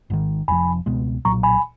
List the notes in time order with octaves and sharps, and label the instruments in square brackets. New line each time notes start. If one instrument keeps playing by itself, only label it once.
[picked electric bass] G#1 G#2 D#3
[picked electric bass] F1 F2 F3 [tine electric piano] G#5 B5
[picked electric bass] C#2 B2 G#3 B3
[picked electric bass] B1 A#2 F#3 [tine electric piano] A#5 C#6
[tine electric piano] G#5 B5